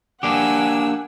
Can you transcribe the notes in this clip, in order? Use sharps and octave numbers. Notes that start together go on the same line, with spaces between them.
A#3 D4 G4 F#5 G#5 E6